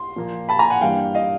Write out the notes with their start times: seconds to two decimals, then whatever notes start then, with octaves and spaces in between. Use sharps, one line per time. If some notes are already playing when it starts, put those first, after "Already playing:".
Already playing: C6
0.16 A#2 F3 A#3
0.49 A5 B5
0.59 G#5 A#5
0.70 F#5 G#5
0.81 G2 E3 G3 A#3 F5 G5
1.15 D#5 F5